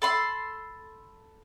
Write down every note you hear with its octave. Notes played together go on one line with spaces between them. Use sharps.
A4 B5 C6